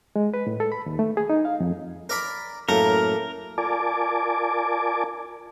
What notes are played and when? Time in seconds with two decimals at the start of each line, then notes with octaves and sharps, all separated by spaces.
0.16 G#3
0.34 B4
0.47 A2
0.60 A4
0.72 B5
0.86 D#2
0.99 A3
1.17 G#4
1.30 D#4
1.45 F5
1.60 F2
2.09 A#4 D5 B5
2.69 F#2 A2 A3 A#3 A#4
3.58 F4 A#4 D5 G#5 A5 D6